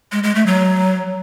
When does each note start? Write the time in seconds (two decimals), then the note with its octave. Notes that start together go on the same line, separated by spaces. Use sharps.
0.12 G#3
0.24 G#3
0.35 A3
0.46 F#3